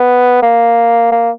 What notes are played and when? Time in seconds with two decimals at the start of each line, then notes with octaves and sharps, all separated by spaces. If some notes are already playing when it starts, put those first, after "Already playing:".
Already playing: B3
0.42 A#3
1.12 A#3